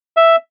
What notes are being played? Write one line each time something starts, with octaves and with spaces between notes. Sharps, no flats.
E5